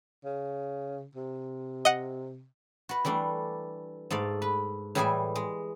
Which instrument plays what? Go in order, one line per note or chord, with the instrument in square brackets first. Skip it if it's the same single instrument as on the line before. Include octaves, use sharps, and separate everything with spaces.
[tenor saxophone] C#3
C3
[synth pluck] D#5 F#5
[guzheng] F#4 B4
E3 G3 A3 D4
G#2 A3 D5 F5
B4
A2 E3 G3 G#4 E5 G#5
G#3